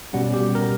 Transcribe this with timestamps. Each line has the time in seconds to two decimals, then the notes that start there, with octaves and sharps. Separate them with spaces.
0.13 B2 G3 C#4 F#5
0.34 G4
0.55 A#4